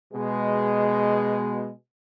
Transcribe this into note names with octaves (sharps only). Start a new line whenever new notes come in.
B2 G#3